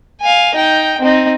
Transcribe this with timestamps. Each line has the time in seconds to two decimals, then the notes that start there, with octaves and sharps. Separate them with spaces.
0.21 F5 G#5
0.55 D#4 G5
1.01 C4 D#4